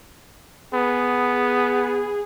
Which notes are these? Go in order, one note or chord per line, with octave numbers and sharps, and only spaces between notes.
B3 G#4